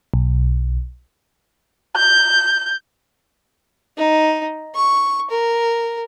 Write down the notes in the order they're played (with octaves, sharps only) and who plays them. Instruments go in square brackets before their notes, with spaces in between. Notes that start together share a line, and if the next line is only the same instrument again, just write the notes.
[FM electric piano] B1
[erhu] G6
[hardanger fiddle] D#4
C#6
A#4